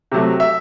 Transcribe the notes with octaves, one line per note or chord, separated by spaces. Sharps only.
C3 F#3 A3
E5